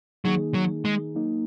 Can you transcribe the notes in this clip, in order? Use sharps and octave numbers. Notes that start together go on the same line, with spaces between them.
D#3 F#3 A#3 D#4 G#4
F#3
G#3
F#3 A#3 D#4